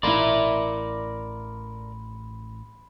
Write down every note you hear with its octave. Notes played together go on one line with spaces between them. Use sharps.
A1 E4 A#4 D5 F5 B5 C6